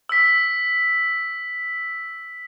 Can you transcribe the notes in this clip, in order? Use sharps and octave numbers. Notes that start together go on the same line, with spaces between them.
E6 B6